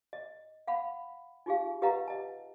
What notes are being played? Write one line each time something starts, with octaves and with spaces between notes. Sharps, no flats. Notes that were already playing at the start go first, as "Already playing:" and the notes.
D#5
F5 F#5 B5
D#4 F4 G4 G#4 F5
G4 B4 D#5 F5 F#5 A#5
D#5 A5